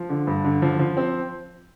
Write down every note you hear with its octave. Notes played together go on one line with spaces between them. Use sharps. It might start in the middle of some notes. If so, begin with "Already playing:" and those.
Already playing: F3
D3
G2
D3
F3
F3
C4